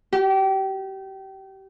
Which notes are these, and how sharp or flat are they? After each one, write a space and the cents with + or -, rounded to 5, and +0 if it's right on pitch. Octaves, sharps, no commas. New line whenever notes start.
G4 -30